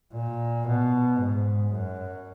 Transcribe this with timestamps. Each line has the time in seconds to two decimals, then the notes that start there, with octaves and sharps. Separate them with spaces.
0.14 A#2
0.67 B2
1.20 G#2
1.73 F#2